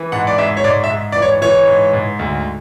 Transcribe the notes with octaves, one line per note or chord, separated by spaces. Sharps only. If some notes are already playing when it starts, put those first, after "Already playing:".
Already playing: E3
G#2 F#5
D5
G#2 E5
C#5
G#2 D5
E5
G#2
E3 D5
C#5
E3 C#5
G#2
G#2
D2